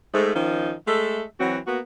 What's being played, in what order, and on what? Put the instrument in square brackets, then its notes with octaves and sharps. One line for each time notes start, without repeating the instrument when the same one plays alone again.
[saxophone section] G#2 A3
D#3 F3 C#4 D#4
G#3 A3 A4 E5
E3 F#3 C4 F#4
A#3 B3 F#4